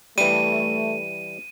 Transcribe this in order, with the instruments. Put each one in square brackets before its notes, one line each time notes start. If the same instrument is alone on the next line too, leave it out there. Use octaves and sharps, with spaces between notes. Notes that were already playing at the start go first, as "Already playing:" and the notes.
[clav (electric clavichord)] E3 G3 [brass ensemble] A3 [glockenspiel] D#7